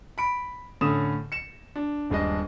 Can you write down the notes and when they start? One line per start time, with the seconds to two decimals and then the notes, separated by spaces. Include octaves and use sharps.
0.18 B5 D7
0.81 A2 D3 C#4 D#6 E7
1.32 C#7 E7
1.76 D4
2.10 D#1 G2 G#3 D4 D#5